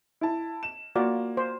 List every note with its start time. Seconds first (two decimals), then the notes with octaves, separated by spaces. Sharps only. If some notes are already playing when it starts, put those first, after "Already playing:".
0.21 E4 A5
0.63 E7
0.95 A#3 F4 F#4 D5
1.37 C5